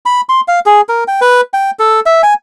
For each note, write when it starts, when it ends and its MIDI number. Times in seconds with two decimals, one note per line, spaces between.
0.06 0.21 83
0.29 0.41 84
0.48 0.60 77
0.66 0.81 68
0.89 1.04 70
1.08 1.20 79
1.21 1.41 71
1.54 1.71 79
1.79 2.00 69
2.06 2.22 76
2.23 2.34 80